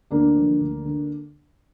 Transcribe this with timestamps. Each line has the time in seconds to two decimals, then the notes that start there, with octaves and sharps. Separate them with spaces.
0.11 D2 A#3 D4
0.35 D3 F3
0.60 D2
0.85 D3